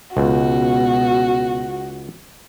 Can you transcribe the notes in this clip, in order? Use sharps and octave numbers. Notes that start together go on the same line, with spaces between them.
C#2 B2 F#4